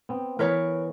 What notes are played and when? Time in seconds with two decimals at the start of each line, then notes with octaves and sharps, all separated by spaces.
0.09 B3 C4
0.39 E3 B3 A#4 B4 C#5